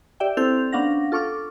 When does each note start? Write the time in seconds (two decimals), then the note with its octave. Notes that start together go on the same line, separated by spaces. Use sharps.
0.20 G4 D5 E5 G5
0.37 C4 E4 A4 C5 G6 F7
0.72 B3 C#4 D4 F5 F#5 A#6
1.12 F4 A4 C#6 D6 F6